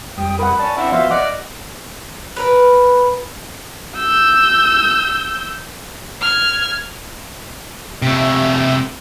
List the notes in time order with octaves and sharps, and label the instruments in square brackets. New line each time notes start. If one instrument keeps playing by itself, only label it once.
[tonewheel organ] F2 G3 D#6 [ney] G5
[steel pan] A#4 F#5 [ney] B5
[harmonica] C#4 A5 [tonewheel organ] D5
[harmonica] C4 D4 E4 [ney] F#5
[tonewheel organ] F3 B3 [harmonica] F#3 C5 F5 [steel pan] E5
[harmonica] D5 D6 [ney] D#5 [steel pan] F#5 [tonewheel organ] F6
[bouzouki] B3 A#4 B4
[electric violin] E6 G6
[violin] F6 G#6
[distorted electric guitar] C3 A3